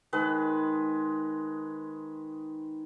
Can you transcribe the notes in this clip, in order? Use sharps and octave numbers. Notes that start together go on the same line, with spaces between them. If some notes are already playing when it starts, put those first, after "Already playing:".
D#3 G#3 B4